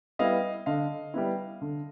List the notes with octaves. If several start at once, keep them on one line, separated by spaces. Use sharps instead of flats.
G3 B3 E4 D#5 F5
D3 D#5 F5
G3 B3 E4
D3